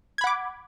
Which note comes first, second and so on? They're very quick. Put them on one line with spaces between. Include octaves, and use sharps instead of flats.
G#6 B5 F#5 D6